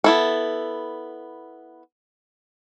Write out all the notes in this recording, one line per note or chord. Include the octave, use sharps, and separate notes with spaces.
B3 E4 A4